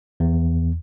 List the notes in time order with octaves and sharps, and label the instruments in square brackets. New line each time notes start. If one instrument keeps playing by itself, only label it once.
[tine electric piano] E2